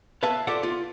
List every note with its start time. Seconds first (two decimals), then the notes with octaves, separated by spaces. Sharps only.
0.23 B4 C#5 E5 F5 A5
0.47 F4 G4 A4 D5 E5 F#5
0.63 F4